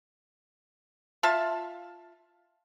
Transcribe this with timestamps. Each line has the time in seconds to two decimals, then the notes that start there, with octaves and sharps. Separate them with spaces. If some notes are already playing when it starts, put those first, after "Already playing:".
1.23 F4 E5 A5